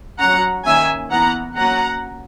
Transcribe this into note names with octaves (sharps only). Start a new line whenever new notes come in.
F#3 C#4 F#5 A#5
D#3 A#3 C#4 E5 G#5
E3 B3 F#5 A#5
F#3 A#3 C#4 F#5 A#5